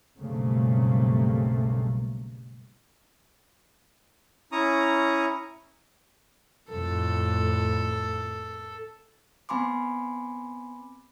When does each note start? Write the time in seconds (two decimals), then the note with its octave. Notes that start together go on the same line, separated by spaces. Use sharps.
0.17 B1 G2 C#3 A3 A#3 C4
4.52 C#4 E4 A#5 C#6 D#6
6.72 F2 A2 A4
9.49 B3 C4 G#5 B5 C6 D6